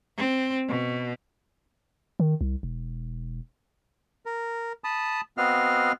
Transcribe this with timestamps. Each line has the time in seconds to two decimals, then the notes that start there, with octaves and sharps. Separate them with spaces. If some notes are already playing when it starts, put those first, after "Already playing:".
0.17 C4
0.69 B2
2.20 D#3
2.41 C2
2.63 E1
4.26 A#4
4.84 A5 B5 D#6
5.38 B3 C4 F#4 D#5 F5 F6